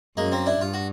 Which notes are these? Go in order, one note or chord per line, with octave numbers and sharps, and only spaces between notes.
F#2 G#3 A#3
A#3 C4
D4 E4
G2 F4
F#4